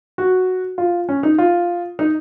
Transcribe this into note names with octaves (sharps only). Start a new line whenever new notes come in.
F#4
F4
C#4
D#4
F4
D#4